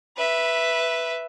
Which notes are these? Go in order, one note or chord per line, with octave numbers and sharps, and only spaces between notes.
B4 E5